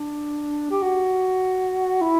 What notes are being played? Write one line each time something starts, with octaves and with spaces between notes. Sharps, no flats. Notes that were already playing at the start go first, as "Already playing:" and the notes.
Already playing: D4
G4
F#4
E4